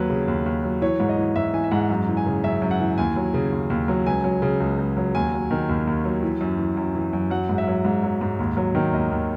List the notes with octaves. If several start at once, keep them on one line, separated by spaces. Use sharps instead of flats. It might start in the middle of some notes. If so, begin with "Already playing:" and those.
Already playing: D#2 F#3 B4
C#3
D#2
D#2
F#3
E3 C#5
G#2
D#5
E3
G#2 E5
E3 G#5
E5
G#2 F#5
F#2
E3
G#5
C#3
F#2 E5
F#2
F#5
E3
D#2 G#5
F#3
C#3
D#2
D#2
F#3
C#2 G#5
F#3
C#3
C#2
C#2
F#3
D#2 G#5
F#3
D#3
D#2
D#2
F#3
E3
F#2
E3
F#2
E3
F#2
F#3 F#5
G#2
E5
F#3
G#2
F#3
G#2
D#2
F#3
D#3
D#2 D#5
D#2